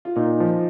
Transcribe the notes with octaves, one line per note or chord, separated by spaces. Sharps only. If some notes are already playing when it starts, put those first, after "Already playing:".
F4
A#2 D#4
F3